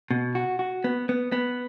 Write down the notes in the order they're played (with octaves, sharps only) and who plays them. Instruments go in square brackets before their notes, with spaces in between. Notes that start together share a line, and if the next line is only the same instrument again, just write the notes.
[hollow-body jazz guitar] B2
F#4
F#4
B3
B3
B3